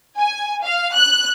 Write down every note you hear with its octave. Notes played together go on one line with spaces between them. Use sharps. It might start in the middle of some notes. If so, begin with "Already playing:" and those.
G#5
F5
F#6